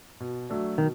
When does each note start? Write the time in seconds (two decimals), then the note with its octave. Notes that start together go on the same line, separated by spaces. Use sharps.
0.20 B2
0.49 F#3 A3 D4 F#4
0.78 B2 D#3